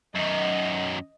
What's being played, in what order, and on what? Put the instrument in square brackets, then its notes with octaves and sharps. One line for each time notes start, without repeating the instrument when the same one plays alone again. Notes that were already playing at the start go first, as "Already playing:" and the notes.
[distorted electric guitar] F#2 D#3 [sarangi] D#5